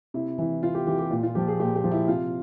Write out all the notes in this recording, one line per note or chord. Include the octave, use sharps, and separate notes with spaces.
C3 E4
E3 E4
C3 F4
G4
E3 G4
G4
A#2 F4
F4
F3 G4
G#4
A#2 G4
G4
F3
E4
C3 F4